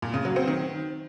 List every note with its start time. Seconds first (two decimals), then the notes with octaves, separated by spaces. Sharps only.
0.02 A#2
0.14 C#3
0.25 F#3
0.36 C4
0.47 D#3